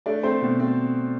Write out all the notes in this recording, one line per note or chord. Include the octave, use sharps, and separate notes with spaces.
A3 D4 D5
A3 C4 C5
B2
C4